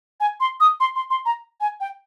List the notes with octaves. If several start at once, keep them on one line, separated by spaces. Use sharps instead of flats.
G#5
C6
D#6
C6
C6
C6
A#5
G#5
G5